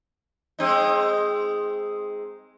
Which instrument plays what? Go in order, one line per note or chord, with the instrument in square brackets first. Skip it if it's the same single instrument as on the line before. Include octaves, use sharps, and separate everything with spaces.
[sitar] G#3 C4 D#4